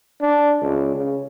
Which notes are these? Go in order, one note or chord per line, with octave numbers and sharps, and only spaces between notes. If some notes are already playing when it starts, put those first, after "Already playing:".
D4
C#2
C#3